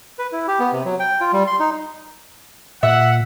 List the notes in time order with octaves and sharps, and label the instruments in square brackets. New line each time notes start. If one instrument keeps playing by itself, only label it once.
[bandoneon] B4
E4
G4
B3
C3
F#3
G5
F4
G3
C6
D#4
[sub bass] A#2 [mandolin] E5 [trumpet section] F#5